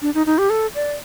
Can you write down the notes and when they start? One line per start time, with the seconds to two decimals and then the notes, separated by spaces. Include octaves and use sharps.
0.02 D4
0.14 D#4
0.26 D#4
0.38 G4
0.50 A4
0.75 D5